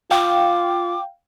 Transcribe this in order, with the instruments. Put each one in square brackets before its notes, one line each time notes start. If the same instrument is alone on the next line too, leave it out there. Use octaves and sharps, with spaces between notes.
[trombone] F4 [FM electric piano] F5 G5 [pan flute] D6